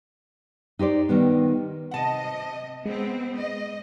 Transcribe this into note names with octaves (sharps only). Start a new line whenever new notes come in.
D#4 G4 C5 D5
D#3 G3 B3
C3 D#5 F#5 A5
G#3 B3 C4
D#5